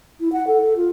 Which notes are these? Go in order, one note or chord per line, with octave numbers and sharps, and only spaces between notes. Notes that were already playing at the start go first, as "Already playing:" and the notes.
E4
F#5
A4
A4
F4